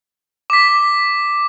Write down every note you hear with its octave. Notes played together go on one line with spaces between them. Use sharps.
D6 B6